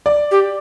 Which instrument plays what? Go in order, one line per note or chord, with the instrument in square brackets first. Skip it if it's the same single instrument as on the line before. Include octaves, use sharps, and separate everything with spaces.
[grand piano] D5
[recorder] G4